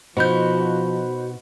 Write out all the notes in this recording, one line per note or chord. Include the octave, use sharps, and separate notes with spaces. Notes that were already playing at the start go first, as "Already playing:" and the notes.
B2 F3 D#4 F#4 C5 B5 G6